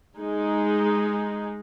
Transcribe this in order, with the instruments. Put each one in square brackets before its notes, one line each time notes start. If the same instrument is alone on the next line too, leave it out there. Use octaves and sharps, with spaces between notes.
[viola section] G#3 D#4 G#4